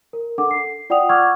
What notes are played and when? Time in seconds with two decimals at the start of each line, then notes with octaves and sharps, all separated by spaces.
0.13 A#4
0.38 D4 A4 F#5 D6
0.51 C7
0.90 F4 D5 F#5 G5 D#6 F7
1.09 F#5 C#6 D6 E6 F6 G#6